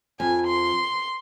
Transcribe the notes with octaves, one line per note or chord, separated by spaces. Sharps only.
F2 G#5
C6